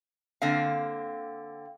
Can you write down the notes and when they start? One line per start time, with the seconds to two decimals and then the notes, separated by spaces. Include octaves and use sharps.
0.42 D3 A#3 C4 F5